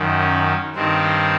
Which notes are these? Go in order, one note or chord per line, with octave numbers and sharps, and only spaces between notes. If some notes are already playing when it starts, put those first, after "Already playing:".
Already playing: F#2 D#3
C#4
G2 D#3 C4